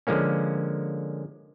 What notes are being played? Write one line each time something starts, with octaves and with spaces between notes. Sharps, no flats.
D3 F3 G#3 A#3 C#4